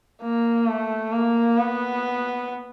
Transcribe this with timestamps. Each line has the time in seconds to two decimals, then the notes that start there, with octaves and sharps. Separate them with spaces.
0.22 A#3
0.67 A3
1.12 A#3
1.58 B3